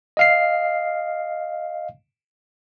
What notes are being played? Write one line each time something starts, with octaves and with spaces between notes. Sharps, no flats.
D#5 F5 C7